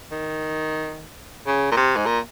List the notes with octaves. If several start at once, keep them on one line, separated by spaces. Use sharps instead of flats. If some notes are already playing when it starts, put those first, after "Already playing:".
D#3
C#3
A#2
C3
G#2
A#2